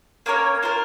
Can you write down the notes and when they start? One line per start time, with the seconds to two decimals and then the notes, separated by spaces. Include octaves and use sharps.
0.26 A#3 C#4 A#4 C#5
0.63 A#3 F4 A#4